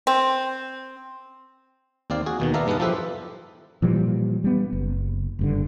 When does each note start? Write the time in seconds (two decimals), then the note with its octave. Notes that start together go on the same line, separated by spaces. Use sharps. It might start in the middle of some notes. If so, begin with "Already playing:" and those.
0.07 C4
2.10 D#2 C4 D5 F5
2.26 F#4 G#4
2.40 D#2 B2 D#3
2.54 B3 D5 E5 F5 A5 A#5
2.67 G2 G#3 B3 D#4 F#5 A5
2.80 F3 E4 G4 A4 B4 C5
3.82 A#2 E3 F3 G3
4.44 G3 B3
4.73 F#1
5.39 F#1 G2 D3